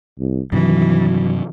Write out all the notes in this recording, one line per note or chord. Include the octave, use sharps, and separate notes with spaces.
C2
G2 C3 D#3 E3 F#3